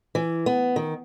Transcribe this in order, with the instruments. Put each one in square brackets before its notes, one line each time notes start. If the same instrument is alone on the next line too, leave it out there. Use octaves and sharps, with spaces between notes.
[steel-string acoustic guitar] E3
B3
D#3